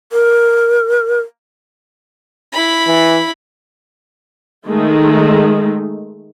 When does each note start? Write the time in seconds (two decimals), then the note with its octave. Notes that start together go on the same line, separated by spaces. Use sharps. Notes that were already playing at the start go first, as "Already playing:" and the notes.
0.12 A#4
2.53 E4 B5
2.87 E3
4.67 D#3 G#3 A3